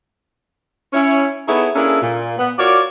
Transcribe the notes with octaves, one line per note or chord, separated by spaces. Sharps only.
C#4 E4 C#5
B3 D#4 E4 G#4 A4 C#5
A#3 C#4 D4 E4 G#4 A4
A#2
B3
F4 F#4 A#4 C#5 D5